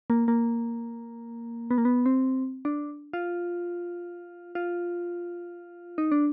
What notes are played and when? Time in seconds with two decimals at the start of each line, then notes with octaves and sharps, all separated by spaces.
0.10 A#3
0.28 A#3
1.71 B3
1.78 A#3
1.85 B3
2.06 C4
2.65 D4
3.13 F4
4.55 F4
5.98 D#4
6.12 D4